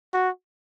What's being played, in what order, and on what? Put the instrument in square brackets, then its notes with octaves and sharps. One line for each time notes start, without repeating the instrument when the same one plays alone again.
[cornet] F#4